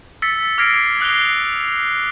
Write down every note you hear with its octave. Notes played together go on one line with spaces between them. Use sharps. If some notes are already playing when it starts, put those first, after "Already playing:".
E6 A6 B6 C#7
D6 F6 G#6 A#6 C7 D7
D#6 F#6 C7 F7 G7